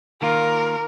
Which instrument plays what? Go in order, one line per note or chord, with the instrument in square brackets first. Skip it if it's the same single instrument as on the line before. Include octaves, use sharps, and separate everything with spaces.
[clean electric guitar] D#3 A#3 F4 [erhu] A#4